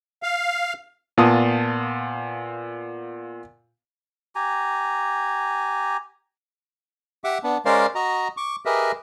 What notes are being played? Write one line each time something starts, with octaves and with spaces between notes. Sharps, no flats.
F5
A#2 B3 F4 A5 D#6
G4 G#5 A#5
G4 E5 F#5 D6
B3 D4
G#3 C#4 A#4 C5 D5 F5
F#4 D#5 A#5
C#6 D6
G4 G#4 A#4 B4 D#5 E5